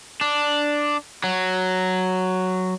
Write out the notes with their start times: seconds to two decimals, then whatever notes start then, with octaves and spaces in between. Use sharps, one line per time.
0.21 D4
1.24 F#3